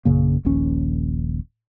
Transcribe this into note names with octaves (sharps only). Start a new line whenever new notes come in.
A#1 F#2 C#3 A#3
D#1 A#1 D#2 C#4